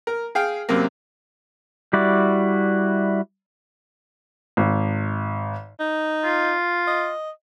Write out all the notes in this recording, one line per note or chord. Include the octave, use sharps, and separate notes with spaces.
A#4
G#4 F5 G5
F#2 C3 A#3
G3 E4 F#4 D5
G#1
D#4
F4
D#5